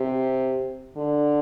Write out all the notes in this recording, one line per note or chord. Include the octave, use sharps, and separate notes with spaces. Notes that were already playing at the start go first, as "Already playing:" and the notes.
Already playing: C3
D3